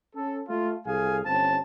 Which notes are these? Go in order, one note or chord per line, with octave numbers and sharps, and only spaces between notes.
C#4 A4
A3 F4
C2 G#4 A4 F5 G#5
G1 C4 C#4 A5